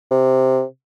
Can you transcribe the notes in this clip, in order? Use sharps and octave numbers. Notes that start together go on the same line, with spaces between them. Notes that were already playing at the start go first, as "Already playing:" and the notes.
C3